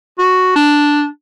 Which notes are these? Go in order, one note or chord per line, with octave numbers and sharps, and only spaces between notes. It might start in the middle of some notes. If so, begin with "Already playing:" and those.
F#4
D4